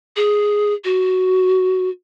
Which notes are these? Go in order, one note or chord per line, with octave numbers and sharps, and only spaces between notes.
G#4
F#4